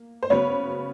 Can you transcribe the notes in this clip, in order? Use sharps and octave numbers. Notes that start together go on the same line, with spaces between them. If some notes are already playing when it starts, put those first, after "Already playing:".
Already playing: A#3
C5
C#3 F#3 B3 B4 C#5